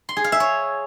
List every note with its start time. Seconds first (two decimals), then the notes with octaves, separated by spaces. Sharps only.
0.09 C6
0.17 G#4
0.24 F5
0.32 E5
0.40 C#5